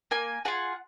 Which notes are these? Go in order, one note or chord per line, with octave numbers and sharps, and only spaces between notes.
A#3 G#5
F4 G#4 F#5